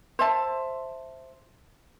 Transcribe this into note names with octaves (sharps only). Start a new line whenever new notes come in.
C5 E5 A5